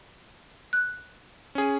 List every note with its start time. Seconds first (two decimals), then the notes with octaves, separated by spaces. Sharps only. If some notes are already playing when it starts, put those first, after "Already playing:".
0.73 F#6
1.55 C#4 G#4